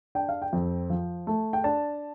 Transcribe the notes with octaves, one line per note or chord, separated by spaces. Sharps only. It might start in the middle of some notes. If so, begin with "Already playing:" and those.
D4 G5
F5
G5
F2
F3
A3
G5
D4 A5